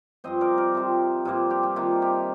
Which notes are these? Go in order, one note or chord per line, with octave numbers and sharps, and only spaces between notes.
G2 F3 C4 C5 D#5
A#4 D5
G4 A#4
C3 F3 C4
G2 F3 A#3 F4
G4
G4
C3 D#3 A#3 D4 F4
G4